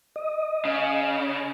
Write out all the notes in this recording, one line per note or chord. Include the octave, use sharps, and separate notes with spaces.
D#5
C#3